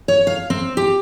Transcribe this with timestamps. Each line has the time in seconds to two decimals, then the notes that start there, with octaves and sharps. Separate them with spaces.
0.08 C#5
0.27 F5
0.50 C4
0.77 G4